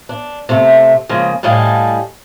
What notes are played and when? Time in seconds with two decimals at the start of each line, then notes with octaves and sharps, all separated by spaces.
0.09 D4
0.49 C3 A3
1.09 C#3 F3 G#3 A#3
1.43 A2 G3 D#5 F5 G#5 A5